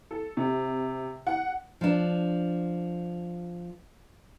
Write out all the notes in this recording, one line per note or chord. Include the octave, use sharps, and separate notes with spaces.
A4
C3
F#5
F3 D4